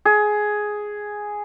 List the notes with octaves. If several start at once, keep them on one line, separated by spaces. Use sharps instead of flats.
G#4